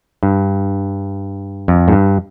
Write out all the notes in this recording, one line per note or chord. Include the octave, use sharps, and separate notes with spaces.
G2
F2
G#2
G2